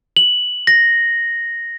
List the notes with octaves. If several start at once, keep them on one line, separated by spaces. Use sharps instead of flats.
F#7
A#6